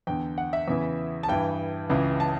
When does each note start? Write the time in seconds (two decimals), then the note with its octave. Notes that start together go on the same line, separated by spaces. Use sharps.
0.07 E2 D3 G5
0.38 F#5
0.53 E5
0.68 E2 C#3 E3
1.23 A5
1.28 G2 E3 G5
1.90 C#2 C#3 E3
2.20 A5